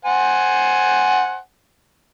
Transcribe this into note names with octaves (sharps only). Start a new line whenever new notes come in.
C5 F#5 G#5